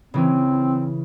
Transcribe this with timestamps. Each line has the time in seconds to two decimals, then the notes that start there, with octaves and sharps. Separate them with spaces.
0.14 C#3 E3 C4 C#4